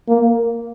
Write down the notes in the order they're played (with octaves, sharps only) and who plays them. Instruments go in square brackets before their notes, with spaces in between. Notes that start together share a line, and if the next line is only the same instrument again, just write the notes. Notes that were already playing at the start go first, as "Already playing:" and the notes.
[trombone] A#3